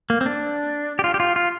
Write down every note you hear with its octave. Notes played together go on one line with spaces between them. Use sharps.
A#3
C4
D4
G4
F4
G4
F4
F4